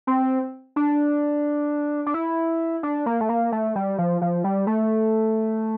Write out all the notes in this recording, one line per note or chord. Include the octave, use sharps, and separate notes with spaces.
C4
D4
D4
E4
D4
A#3
A3
A#3
A3
G3
F3
F3
G3
A3